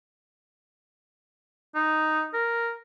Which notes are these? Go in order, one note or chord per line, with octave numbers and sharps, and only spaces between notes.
D#4
A#4